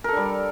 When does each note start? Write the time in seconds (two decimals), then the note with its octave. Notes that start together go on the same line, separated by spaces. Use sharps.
0.04 A#4
0.08 A4
0.13 D4
0.17 G3